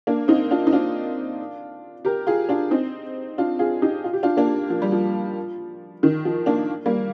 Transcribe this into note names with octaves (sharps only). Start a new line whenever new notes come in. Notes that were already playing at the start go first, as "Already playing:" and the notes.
A#3 D4
C4 D#4
D4 F4
D#4
D4 F4
G4 A#4
F4 G#4
D4 F4
C4 D#4
D4 F4
F4 G#4
D#4 G4
F4
G4
D4 F4
A#3 D4
F3
G3
F3
D#3
F3
A#3 D4
G3 A#3